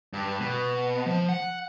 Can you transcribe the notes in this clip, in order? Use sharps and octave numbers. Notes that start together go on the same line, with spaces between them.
G2
B2
F3
F#5